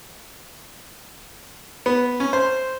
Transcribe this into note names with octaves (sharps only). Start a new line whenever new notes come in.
B3
C#4
C5